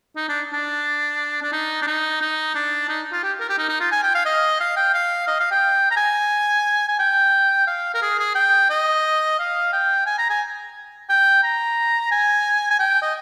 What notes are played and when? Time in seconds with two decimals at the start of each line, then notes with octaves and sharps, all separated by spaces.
0.16 D#4
0.29 D4
0.53 D4
1.42 D4
1.52 D#4
1.82 D4
1.87 D#4
2.21 D#4
2.55 D4
2.89 D#4
3.12 F4
3.23 G4
3.40 A#4
3.49 G4
3.58 D#4
3.69 D#4
3.80 F4
3.92 G#5
4.03 G5
4.15 F5
4.25 D#5
4.60 F5
4.76 G5
4.94 F5
5.28 D#5
5.40 F5
5.51 G5
5.91 A#5
5.96 G#5
6.88 G#5
6.99 G5
7.67 F5
7.94 A#4
8.02 G#4
8.19 G#4
8.35 G5
8.70 D#5
9.39 F5
9.73 G5
10.06 G#5
10.18 A#5
10.30 G#5
11.10 G5
11.43 A#5
12.11 G#5
12.71 G#5
12.79 G5
13.02 D#5